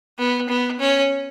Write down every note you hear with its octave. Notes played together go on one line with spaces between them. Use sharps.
B3
B3
C#4